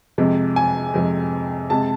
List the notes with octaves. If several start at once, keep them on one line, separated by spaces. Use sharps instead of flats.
F2 C3 G#3
G#5
F2 C3 G#3
C3 G#3 A5